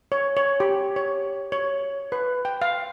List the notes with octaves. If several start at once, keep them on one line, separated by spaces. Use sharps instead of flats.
C#5
C#5
G4
C#5
C#5
B4
G5
F5